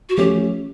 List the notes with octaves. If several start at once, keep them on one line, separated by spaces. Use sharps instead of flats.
F#4
F3 A3 C#4 G4